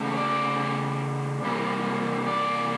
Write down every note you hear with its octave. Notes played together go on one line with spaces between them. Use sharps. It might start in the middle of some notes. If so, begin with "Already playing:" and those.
Already playing: C#3 A3
C#5
D5
C3 E3 G3 A#3
D5